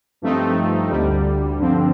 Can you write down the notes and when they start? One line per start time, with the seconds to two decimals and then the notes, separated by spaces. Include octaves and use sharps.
0.22 G2 F3 A3 C4 D#4
0.90 D2 D3 G3
1.59 G2 D3 F3 C4